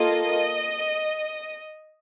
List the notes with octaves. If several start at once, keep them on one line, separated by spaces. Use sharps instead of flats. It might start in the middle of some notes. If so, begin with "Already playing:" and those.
Already playing: A#3 F4 A4 D#5